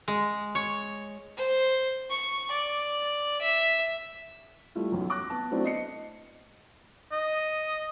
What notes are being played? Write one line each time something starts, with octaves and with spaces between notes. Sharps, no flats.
G#3
C#5
C5
C#6
D5
E5
G3 A3 E4 F4
B1 F#2
D6 F#6 A#6
B3 A5
F#3 A3 B3 C4 D4 E4
D#5 C7 C#7
D#5